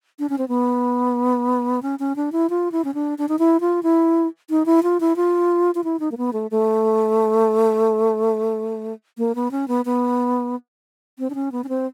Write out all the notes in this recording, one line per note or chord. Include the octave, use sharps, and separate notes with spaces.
D4
C#4
C4
B3
C#4
C#4
D4
E4
F4
E4
C#4
D4
D4
D#4
E4
F4
E4
D#4
E4
F4
E4
F4
F4
E4
D#4
A#3
B3
A3
A3
A#3
B3
C#4
B3
B3
C4
D4
C#4
B3
C#4
C4